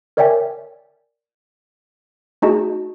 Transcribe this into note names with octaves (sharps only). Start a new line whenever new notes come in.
A#4 C#5 D5 E5 G5 G#5
A3 D#4 F#4 G#4 D#5 A5